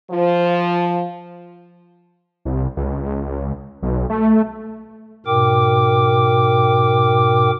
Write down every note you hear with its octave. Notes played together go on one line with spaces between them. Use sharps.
F3
C2
C#2
B1
A3
G#2 B2 A#4 G5 D6